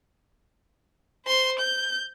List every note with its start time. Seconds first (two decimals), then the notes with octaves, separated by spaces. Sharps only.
1.26 C5 C6
1.59 G6